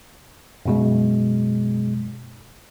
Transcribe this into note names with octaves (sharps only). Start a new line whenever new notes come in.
F#2 B2 G#3